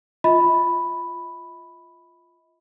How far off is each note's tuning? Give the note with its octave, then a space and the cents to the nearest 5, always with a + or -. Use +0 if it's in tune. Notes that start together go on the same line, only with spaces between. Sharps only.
F4 -5 D#5 +45 B5 +0